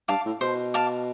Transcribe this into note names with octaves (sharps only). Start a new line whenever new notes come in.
G2 F5 A5 D6
A2
B2 C5
F5 A5 D6